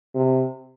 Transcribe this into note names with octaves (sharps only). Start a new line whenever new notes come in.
C3